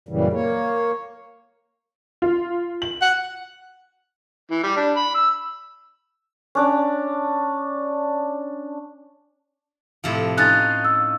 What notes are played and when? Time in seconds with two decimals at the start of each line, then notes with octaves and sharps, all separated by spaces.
0.09 F#2 A#2 C#3 E3 G3
0.33 A#3 C#5
2.22 F4
2.82 F#7
3.02 F#5
4.51 E3
4.63 G3
4.77 D4
4.96 B5
5.15 E6
6.55 C#4 D4 D5
10.04 A2 C3 F3
10.37 C#4 D#4 F4 F#6 A6
10.85 E6